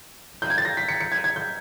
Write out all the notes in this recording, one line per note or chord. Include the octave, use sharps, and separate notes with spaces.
G6
G#6
A6
A#6
B6
C#7
C#7
G#6
G#6
G6